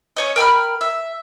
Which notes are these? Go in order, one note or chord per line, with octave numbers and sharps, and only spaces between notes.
C#4 C#5 D#5
A#4 G5 B5 F6
E5